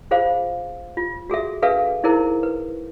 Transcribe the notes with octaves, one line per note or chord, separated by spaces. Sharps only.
F4 G#4 C5 F5
F4
F#4 G#4 A4 E5
D4 G#4 A4 B4 E5 F5
D#4 E4 G#4 A#4 C5
B4